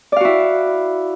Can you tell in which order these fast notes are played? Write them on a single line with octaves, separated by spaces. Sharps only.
D5 F5 F#4 E4